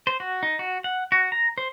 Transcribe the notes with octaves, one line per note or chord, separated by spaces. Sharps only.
C5
F#4
D#4
F#4
F#5
F#4
A#5
C5